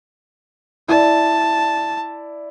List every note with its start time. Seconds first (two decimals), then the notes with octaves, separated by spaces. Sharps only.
0.89 E4 D5 A5